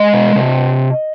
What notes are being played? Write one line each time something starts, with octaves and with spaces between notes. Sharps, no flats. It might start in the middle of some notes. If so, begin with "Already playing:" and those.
Already playing: G#3 D#5
B2
C3